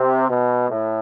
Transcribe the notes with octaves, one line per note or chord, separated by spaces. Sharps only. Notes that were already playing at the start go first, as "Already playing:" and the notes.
Already playing: C3
B2
A2